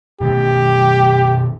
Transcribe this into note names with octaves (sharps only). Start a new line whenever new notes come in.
B2 D#3 A3 G4